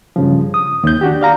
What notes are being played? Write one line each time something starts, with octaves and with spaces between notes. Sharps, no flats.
G2 C#3 F3
D#6
D#2 G6
D4 F#4 G4
D5 F5 A#5